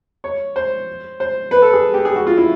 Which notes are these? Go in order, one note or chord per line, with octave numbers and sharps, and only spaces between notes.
C#5
C5
C5
B4
A4
G#4
G4
G#4
F#4
F4
E4